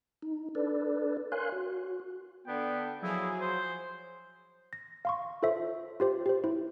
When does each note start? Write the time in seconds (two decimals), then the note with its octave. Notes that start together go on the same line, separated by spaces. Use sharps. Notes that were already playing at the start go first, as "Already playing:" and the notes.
0.22 D#4
0.55 D4 A4 B4 D5
1.32 A#4 C#5 F5 G#5 C6 F#6
1.52 F#4
2.47 D3 B3 D4 G5
3.02 F3 F#3 E4 G#4
3.41 C5
4.73 A#6
5.05 F5 C6 C#6
5.42 F4 A4 C5 C#5 E5
6.00 F4 G4 C5
6.26 G4 C5
6.44 E4 C5